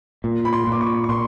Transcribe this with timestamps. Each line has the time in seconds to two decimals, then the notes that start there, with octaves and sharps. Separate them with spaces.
0.24 A#2
0.45 B5
0.53 C6
0.67 A#2 D6
0.81 C#6
1.04 C#6
1.09 A#2 C6